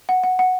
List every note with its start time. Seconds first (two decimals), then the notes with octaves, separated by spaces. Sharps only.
0.09 F#5
0.24 F#5
0.39 F#5